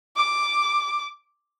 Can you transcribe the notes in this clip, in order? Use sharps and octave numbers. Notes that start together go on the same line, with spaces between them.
D6